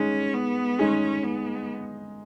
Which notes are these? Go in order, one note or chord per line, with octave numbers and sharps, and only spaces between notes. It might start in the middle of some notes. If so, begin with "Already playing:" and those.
Already playing: G#3 C#4 D#4 G#4
B3
G#3 C#4 D#4 G#4
B3